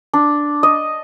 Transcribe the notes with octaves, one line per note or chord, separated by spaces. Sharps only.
D4
D#5